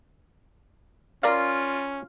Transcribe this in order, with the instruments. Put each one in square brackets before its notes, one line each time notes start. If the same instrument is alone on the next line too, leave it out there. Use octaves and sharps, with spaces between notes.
[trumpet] C#4 [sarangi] F4 [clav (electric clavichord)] A#4 D5 F5